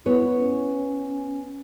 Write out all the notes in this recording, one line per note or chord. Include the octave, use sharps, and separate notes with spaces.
B3 E4 C#5
C#4